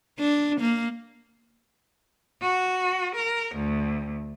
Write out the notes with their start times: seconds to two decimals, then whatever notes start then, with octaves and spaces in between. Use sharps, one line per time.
0.19 D4
0.60 A#3
2.42 F#4
3.15 A#4
3.55 D2